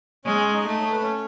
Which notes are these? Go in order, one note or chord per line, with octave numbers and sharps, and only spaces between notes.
G#3 C#4 C#5
D#4 D#5
A3
C#5
B4
C#4 C#5